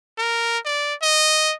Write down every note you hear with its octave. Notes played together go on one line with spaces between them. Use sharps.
A#4
D5
D#5